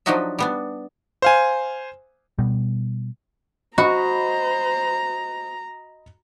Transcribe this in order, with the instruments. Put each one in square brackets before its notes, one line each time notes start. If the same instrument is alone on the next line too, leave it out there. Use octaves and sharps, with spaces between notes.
[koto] F3 F#3 D4 D#4 F#4 E5
G3 B3 D4
[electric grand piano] C5 F5 G#5
[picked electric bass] B2 G3
[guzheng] F#4 [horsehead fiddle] C5 [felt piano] D#5 B5 [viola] A#5